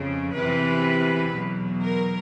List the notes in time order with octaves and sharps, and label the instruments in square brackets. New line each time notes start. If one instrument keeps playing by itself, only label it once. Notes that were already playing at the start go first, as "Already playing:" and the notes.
Already playing: [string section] F2 C#3 F3
E2 C3 E3 B4
E2 B2 F#3
A#4